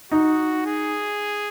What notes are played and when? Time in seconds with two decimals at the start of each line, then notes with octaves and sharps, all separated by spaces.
0.11 D#4 F#4
0.66 G#4